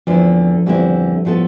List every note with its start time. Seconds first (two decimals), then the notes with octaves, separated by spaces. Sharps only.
0.07 E2 D3 F3 A3 C4 E4
0.66 E2 D3 G3 A3 C4 E4
1.25 A2 F3 B3 E4 A4